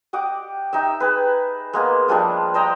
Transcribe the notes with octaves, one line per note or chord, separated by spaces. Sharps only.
G4 D#5 F#5 D6
D#4 G4 E5
G#4 B4
G#3 A#3 B3
F3 G3 G#3 D4
C5 D#5 G5 A#5